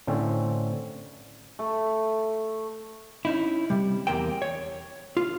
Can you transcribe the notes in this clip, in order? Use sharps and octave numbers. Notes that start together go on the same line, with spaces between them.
A2 D3 C4 C#4
A3
C#4 D#4 E4
C3 G3
E2 C3 A#3 C4 G5
C#5
F4